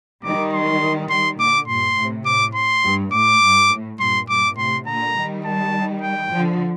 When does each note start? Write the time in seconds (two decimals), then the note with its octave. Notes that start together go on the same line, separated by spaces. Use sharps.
0.23 D#3 G3 D6
0.53 C6
1.10 D#3 G3 C6
1.39 A#2 D3 D6
1.68 G2 A#2 C6
1.97 A2 C3
2.26 A2 D6
2.55 C6
2.85 G2
3.13 A2 D6
3.41 G2
3.71 A2
4.00 G2 A#2 C6
4.28 G2 A#2 D6
4.57 A2 C3 C6
4.86 A#2 D3 A#5
5.16 D#3 G3
5.45 A5
6.02 G5
6.31 D3 F3